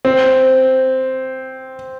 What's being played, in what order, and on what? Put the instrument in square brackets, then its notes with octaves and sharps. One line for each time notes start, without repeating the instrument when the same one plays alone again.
[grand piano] C4